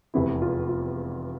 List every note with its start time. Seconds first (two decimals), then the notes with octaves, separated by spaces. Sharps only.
0.14 F1 E2 C3 E4
0.42 F4
0.69 F4